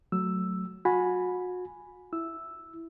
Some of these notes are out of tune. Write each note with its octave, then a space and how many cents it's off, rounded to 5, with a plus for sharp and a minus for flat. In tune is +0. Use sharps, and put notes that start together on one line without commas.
F#3 +0 A3 +0 E6 +0
F#4 -35 G#5 +0 B5 +0
E4 +0 E6 -5